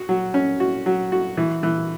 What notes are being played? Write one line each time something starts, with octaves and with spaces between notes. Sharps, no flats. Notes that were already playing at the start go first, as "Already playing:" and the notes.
Already playing: F#4
F#3
C#4
F#4
F#3
F#4
E3
E3